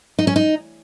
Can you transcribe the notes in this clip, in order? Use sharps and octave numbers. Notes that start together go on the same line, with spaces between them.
D#4
C#4
D#4